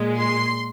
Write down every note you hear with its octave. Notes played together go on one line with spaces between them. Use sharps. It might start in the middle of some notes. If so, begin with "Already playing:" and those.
Already playing: A#2 G#3
C6